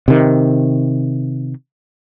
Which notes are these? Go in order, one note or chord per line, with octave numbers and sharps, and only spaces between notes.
C3 D#3